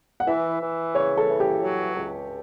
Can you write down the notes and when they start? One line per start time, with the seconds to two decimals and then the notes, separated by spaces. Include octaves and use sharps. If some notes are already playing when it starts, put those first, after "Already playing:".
0.20 F#5
0.27 E3 E5
0.61 E3
0.95 C#3 C#5
1.17 A4
1.28 E3
1.40 G4
1.62 F#3
1.96 C#2